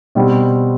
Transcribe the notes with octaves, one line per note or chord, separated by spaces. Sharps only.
B2 G3 C4